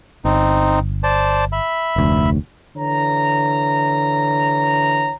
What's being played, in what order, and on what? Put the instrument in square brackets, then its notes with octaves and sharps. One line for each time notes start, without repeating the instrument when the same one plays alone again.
[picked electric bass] G1 [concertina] C4 D#4
[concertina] C5 D5 A5
E5 B5
[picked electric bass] F1 D2
[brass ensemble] D3 E3 C#5 A#5